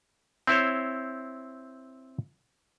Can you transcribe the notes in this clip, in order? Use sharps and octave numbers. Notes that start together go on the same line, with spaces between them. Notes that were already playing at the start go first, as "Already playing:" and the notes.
C4 E4 C5 C#5